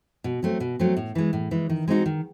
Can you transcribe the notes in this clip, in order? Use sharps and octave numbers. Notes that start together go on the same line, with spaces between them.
B2
F#3 A3 C4
B2
F#3 A3 C4
A2
E3 G#3
A2
E3 G#3
D#3
G#3 C4 D#4 F#4
D#3